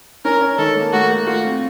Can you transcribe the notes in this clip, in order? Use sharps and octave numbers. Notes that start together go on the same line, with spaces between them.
C#4 A#4
C#5
D#3 A4
A#3
A3 F#4
A3
F4 F#4
C4